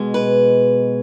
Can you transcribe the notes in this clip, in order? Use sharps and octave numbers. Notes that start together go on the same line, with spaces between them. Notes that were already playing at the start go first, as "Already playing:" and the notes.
Already playing: B2 G#3
B4